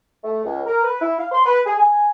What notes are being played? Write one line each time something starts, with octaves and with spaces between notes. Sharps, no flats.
A3
C#2
A#4
B4
E4
F5
C6
B4
G#4
G#5